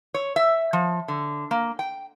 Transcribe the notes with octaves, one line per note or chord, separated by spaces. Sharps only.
C#5
E5
F3
D3
A#3
G5